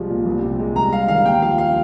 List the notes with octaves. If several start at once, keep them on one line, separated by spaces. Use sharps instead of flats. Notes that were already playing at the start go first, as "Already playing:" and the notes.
Already playing: C2 F3 G#3
A#2
C2
C3
G#3
C2 A#5
G3 F5
D#3 F5
D#2 G5
F3 F5
F5